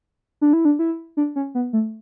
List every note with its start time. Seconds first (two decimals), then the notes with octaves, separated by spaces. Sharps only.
0.41 D4
0.53 E4
0.65 D4
0.79 E4
1.17 D4
1.36 C#4
1.55 B3
1.73 A3